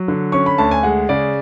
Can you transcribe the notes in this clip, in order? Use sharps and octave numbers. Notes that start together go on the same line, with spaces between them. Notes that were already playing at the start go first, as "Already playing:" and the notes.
Already playing: F#3
D3
C#4 C#6
B5
D2 A5
G#5
G#3 F#5
C#3 D5